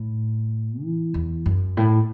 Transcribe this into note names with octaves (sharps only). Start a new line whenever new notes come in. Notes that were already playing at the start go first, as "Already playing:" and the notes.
Already playing: A2
E3
E2
F#2
A2